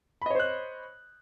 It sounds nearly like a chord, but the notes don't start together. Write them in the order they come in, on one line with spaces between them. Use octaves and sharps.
B5 D#5 C#5 C5 F#6